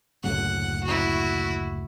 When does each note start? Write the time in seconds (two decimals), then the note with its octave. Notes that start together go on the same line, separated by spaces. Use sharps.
0.24 F#1 D2 A2 F#5
0.84 E4 F#4